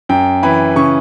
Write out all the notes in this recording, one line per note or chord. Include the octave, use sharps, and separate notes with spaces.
F#2 G5
E3 B5
C#3 C#6